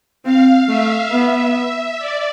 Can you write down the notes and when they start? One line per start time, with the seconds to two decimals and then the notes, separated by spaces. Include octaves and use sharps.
0.24 C4 F5
0.68 A3 E5
1.12 B3
1.99 D5